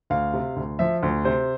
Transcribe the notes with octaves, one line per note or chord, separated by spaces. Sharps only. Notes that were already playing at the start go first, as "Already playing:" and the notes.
D2 F5
C3
D2
F3 E5
D2
C3 C5